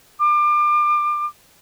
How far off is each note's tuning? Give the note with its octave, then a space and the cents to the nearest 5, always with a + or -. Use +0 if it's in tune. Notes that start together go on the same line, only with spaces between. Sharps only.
D6 +30